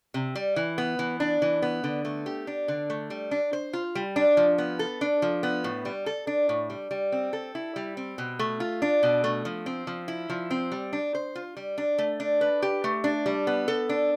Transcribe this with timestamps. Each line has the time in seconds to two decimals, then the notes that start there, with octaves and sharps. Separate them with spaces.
0.14 C3
0.35 G3
0.56 E3
0.78 B3
0.99 E3
1.20 D4
1.42 E3
1.62 B3
1.84 D3
2.05 A3
2.26 G4
2.47 D4
2.68 D3
2.90 A3
3.10 G3
3.31 D4
3.53 C5
3.73 F4
3.95 G3
4.16 D4
4.37 F3
4.58 B3
4.79 A4
5.01 D4
5.22 F3
5.43 B3
5.64 A2
5.85 G3
6.06 A4
6.27 D4
6.49 A2
6.70 G3
6.91 G3
7.12 C4
7.33 A4
7.55 E4
7.76 G3
7.97 C4
8.18 B2
8.39 A3
8.60 F4
8.82 D4
9.03 B2
9.24 A3
9.45 F3
9.66 C4
9.87 F3
10.08 E4
10.30 F3
10.51 C4
10.72 G3
10.93 D4
11.15 C5
11.35 F4
11.57 G3
11.78 D4
11.98 A3
12.20 D4
12.41 B4
12.62 G4
12.84 A3
13.04 D4
13.26 G3
13.47 B3
13.68 A4
13.89 D4